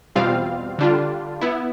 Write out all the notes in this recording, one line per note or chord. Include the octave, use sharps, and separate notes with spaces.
E2 B2 G3 C4 F4 F5
D3 G3 D4 F4
B3 E4